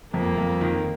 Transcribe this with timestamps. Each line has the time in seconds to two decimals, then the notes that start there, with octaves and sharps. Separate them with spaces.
0.14 F2 A#3
0.37 F2
0.61 D#3